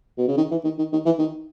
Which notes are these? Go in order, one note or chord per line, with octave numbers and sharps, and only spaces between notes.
B2
C#3
D#3
E3
D#3
D#3
D#3
E3
D#3